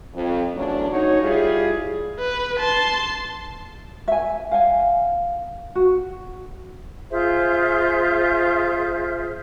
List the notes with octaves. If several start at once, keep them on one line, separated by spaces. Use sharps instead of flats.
F2
E2 F#3 A3 C#4 D4
D#4 F#4 C#5
G3 E4 F4 G#4
B4
A5 C6
E5 G#5
F5 F#5 G#5
F#4
F4 G#4 C5 E5